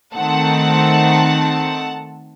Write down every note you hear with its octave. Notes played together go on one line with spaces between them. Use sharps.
D#3 A3 C4 F#5 A5